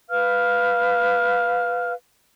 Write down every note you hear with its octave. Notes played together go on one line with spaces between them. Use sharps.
B4 F5 F6